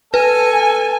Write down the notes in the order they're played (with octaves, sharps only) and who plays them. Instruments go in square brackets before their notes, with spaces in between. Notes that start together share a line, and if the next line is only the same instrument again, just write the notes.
[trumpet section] A4 [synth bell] B4 [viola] G#5